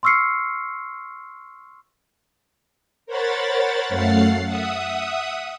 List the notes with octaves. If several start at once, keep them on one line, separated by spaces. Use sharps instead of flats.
C6 C#6 E6 F6 C7 C#7
A#4 C5 C#5 F#5 B5 A6
F#2 A3 F5 F#5 A6 C7
E5 F#5 D#6